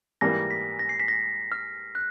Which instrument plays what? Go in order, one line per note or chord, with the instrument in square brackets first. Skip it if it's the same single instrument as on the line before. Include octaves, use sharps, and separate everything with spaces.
[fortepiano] G#2 E3 G3 A#3 [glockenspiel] A#6
[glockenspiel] B6
A#6
C7
B6
A#6
F6
F#6